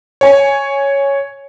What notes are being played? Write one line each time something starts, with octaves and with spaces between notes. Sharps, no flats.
C#5 G#5